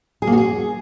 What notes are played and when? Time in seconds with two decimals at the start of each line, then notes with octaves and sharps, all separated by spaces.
0.22 G#4
0.27 A#3
0.32 F#4
0.38 G#4